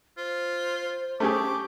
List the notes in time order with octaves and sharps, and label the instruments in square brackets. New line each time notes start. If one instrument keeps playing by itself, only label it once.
[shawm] F4 [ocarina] C5
[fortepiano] A3 C#4 G#4 [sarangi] G4 [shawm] D6